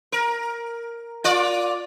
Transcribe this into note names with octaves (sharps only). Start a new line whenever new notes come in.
A#4
F4 D5